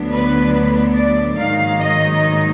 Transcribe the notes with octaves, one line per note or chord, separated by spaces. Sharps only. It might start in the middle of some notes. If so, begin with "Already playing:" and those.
Already playing: D2 D3 F#3 B3 D4
B4
D5
G#2 D#3 F#3 A#3 D#4 F5
D#5